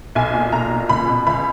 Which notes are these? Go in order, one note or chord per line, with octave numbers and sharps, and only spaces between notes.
B1 G#5
A#2
B1 A#5
A#2
C#2 B5
B2
C#2 B5